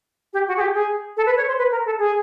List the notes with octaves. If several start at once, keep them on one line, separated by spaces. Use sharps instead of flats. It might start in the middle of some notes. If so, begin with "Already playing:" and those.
G4
F#4
G#4
G4
G#4
A4
B4
C#5
C5
B4
A#4
A4
G#4